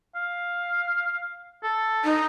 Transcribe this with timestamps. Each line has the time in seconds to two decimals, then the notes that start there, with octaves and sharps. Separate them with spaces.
0.15 F5
1.63 A4
2.04 D#4